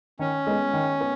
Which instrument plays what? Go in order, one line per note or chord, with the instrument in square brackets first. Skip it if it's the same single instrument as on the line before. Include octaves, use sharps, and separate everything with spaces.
[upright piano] D#3 [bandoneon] C#4
[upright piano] G#3 B3
D#3
B3